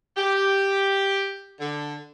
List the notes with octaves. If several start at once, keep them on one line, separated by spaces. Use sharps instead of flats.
G4
D3